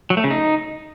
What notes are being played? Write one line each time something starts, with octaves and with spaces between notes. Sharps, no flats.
F#3
A3
C#3
D#4